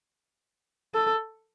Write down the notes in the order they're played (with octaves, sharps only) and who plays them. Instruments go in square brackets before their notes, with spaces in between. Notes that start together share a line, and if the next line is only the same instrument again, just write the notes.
[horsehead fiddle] A4